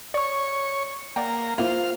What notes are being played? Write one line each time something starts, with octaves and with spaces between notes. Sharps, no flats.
C#5 D5 C#6
A#3 D5 F#5 G5
A#3 E4 F4 C5 F5